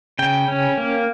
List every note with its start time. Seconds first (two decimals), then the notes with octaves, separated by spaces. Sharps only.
0.19 C#3 G5
0.48 C#4
0.77 A#3